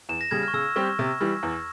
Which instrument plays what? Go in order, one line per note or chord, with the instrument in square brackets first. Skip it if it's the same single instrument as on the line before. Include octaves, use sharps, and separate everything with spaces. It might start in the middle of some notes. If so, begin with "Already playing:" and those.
[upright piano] E2 [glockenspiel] E7
[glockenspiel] A#6
[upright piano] C#3 G3 [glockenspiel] G#6
[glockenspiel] C#6 F6
[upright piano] C#3 [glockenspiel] E6
[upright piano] G3 C4 G4 [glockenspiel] C#6
[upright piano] C3
E3 G3
E2